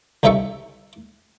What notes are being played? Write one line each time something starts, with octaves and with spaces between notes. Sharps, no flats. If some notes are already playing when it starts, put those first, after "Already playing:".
C2 C#3 D#4 A4 E5 C#6